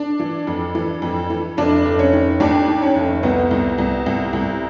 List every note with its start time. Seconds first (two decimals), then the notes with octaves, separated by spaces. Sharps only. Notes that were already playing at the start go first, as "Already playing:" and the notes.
Already playing: D4
0.20 E3
0.47 F2
0.75 E3
1.02 F2
1.30 E3
1.57 F1 D4
1.85 F1
1.99 C#4
2.13 D#3
2.40 D#2 D4
2.68 D#3
2.82 C#4
2.95 F1
3.23 C2 B3
3.51 C2
3.78 C2
4.06 C2
4.33 C2